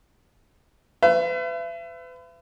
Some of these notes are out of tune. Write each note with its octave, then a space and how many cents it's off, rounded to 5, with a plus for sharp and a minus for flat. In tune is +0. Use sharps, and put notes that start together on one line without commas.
B4 +40 E5 +40